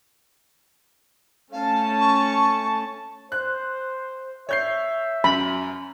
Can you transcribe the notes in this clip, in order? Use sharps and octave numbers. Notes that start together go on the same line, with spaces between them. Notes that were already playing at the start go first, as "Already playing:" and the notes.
A3 C#4 F5 A5
C#6
C5 F#6
C#5 E5 G6 C7
F#2 B5